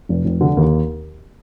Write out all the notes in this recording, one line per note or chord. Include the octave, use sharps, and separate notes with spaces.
F1
F1
D3
D#2